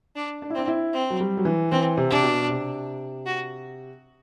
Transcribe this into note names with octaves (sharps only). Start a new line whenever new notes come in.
D4
D4
E4
C4 D4
E4
C4
F#3
G3
F#3
E3
E3 C4
C3
C3 D4
B2
C3
F#4